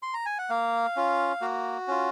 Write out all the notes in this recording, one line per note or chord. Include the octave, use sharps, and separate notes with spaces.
C6
A#5
G#5
F#5
A#3 F5
C#4 F4
A#3 F#4
C#4 F4